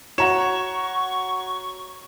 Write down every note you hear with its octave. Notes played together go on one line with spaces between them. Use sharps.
F#4 C#5 F#5 A#5 C#6 E7